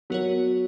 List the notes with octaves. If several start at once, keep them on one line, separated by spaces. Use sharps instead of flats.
F#3 B3 F#4 A#4 C#5